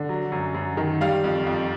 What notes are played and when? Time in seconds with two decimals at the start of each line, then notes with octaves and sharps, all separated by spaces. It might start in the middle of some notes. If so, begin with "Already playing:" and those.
Already playing: D3
0.09 F#3
0.32 F#2
0.54 F#2
0.77 D#3
1.01 G3 F5
1.24 F2
1.46 F2